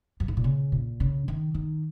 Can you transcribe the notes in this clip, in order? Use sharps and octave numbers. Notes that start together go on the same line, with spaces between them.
F#2
G#2
A#2
C#3
A#2
C#3
D#3
D#3